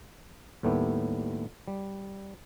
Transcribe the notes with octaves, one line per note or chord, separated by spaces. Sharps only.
D#2 A2 G3 A3 B3
G3